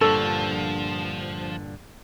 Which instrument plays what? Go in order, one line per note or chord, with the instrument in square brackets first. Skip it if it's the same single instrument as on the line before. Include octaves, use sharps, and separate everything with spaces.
[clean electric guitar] G2 A#2 D3 [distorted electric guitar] F3 [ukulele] A4 [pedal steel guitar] A5 C#6 E6